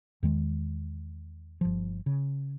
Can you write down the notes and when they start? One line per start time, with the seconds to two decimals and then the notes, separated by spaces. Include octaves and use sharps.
0.23 E2 D#3 G#3
1.61 G1 F3
2.06 C#3